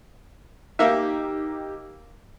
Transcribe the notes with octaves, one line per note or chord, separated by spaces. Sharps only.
A#3 D#4 G4 E5